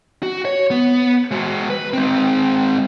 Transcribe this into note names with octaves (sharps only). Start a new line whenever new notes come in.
F#4
C#5
B3
G#3 F#4
B4
G#3 C4